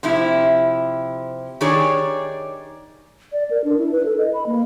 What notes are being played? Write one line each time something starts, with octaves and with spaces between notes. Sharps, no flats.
C3 F3 E4
D#3 D4 G4 G#4 C#5 D5
D5
A#4
D4
E4
B4
A4
D#5
B5
A#3